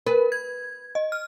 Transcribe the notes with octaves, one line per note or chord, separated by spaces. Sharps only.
A#4 B4
G#6
D#5
F6